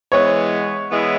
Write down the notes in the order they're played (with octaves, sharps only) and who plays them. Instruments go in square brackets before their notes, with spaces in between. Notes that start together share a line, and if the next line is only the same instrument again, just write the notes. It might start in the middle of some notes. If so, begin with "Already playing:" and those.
[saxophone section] E3 G#3 B3 [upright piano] C#5
[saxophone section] E3 G#3 B3 E4